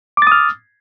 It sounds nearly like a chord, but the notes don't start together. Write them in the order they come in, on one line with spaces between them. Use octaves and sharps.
D6 A6 D#6 F6